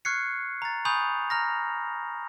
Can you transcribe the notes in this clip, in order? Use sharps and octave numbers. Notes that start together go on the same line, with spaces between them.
C#6 F6 F#6 G#6 C7 C#7
A#5 A6
G#5 B5 C#6 D#6 G6 F7
A#5 F6 A#6